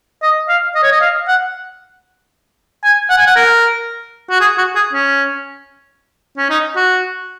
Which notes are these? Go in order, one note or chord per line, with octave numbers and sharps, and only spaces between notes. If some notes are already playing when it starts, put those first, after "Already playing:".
D#5
F5
D#5
C#5
D#5
F5
F#5
G#5
F#5
G#5
F#5
A#4
F#4
G#4
F#4
G#4
C#4
C#4
D#4
F#4